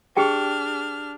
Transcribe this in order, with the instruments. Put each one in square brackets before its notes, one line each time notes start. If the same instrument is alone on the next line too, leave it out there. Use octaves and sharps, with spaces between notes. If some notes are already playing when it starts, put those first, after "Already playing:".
[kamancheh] D4 F6 [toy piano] G4 G#4 G5